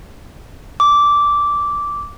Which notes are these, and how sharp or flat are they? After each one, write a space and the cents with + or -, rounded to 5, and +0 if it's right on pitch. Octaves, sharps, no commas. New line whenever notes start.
D6 -10